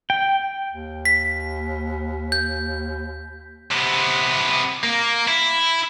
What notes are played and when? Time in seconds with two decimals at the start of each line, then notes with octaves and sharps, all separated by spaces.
0.10 G5
0.71 D#2
1.05 B6
2.32 G6
3.71 C3 B3
4.83 A#3
5.28 E4